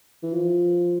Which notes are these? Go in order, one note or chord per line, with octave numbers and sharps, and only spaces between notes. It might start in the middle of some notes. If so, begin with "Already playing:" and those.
E3
F3